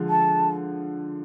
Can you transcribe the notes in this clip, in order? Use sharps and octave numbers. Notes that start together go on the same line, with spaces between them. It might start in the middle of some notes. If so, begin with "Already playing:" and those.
Already playing: D3 F3 G#3
A5